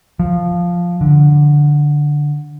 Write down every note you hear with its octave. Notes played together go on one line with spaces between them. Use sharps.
F3
D3